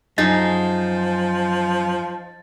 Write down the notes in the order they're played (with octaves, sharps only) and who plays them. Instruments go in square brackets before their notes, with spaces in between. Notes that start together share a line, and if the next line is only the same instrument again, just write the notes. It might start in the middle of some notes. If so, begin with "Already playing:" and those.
[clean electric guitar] F#2 [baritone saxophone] F3 [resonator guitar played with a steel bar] D#4 G#4 [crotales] A6